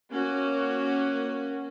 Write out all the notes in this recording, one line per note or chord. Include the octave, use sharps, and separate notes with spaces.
A#3 C#4 F#4